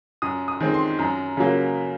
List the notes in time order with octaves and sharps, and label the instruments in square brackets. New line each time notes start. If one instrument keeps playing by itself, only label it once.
[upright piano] F#2 D#6
D#6
D#3 G#3 C4
C6
F#2 A#5
C#3 F#3 A#3